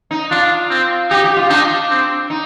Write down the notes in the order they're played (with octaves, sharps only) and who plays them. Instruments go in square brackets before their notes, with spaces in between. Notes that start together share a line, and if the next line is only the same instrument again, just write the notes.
[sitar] D#4
[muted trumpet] D4 [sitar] F4
[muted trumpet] C4
[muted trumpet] D#4 [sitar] G4
[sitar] G4
F4
[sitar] D4 [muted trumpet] D#4
[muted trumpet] C4
[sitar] D#4